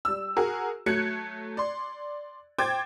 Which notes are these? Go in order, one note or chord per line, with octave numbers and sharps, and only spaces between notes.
G3 E6
F#4 G#4 A#4
F#3 A3 F#6 G#6 C#7
D5 C6
C5 G5 D6 G#6 A6